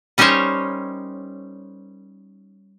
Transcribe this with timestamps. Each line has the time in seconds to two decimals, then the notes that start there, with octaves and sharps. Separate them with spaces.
0.18 G3 C#4 D#4 A#4 C5 C#5